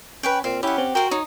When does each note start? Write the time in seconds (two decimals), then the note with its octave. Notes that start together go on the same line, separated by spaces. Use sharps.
0.23 C#4 B4 C#5 G5
0.44 A#2 C4 F5
0.63 C#4 E4 G4 F#5
0.78 C4
0.95 F#4 A#4 C5 G5
1.11 D#4 C#5